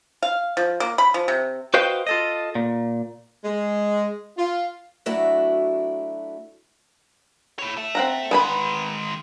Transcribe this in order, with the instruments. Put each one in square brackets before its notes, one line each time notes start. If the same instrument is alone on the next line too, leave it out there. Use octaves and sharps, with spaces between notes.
[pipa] F5
F3
A#3
B5
F3
C3
[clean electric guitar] F#4 B4 C5 D#5 F5 G5
F4 A4 D#5
A#2
[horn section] G#3
F4
[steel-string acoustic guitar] F#3 A3 D4 E4 F#4
[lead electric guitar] E4 C#5
A4 E5
[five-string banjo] C4 F#5 A#5
[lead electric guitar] D#3 G#3 [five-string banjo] B3 G#5 B5